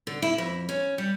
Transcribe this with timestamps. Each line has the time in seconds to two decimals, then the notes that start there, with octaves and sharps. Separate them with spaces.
0.07 D3
0.22 E4
0.38 F2
0.69 C#4
0.98 G3